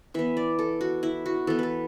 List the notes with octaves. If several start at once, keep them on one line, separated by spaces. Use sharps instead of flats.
E3 B3 E5
D5
A4
F#4
E4
F#4
E3 B3 A4
A4 B4